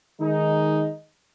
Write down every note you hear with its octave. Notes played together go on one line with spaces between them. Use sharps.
D#3 G#3 D#4